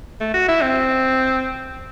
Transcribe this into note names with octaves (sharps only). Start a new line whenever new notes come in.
A3
F#4
E4
C4